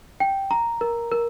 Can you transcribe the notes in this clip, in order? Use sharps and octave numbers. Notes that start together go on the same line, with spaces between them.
G5
A#5
A#4
A#4